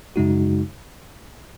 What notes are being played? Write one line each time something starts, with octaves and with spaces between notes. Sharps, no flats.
F#2 C#3 G#3 D#4 F#4